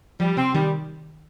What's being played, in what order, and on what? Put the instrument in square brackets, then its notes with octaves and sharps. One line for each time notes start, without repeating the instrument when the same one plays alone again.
[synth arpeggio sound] F3 [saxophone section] G3
[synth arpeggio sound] C3 [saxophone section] C4
[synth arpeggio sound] D#3 [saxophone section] G3